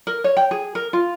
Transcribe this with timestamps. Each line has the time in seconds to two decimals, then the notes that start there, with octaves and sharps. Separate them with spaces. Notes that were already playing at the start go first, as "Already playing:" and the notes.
0.07 A#4
0.24 C#5
0.37 G5
0.51 G#4
0.75 A#4
0.93 F4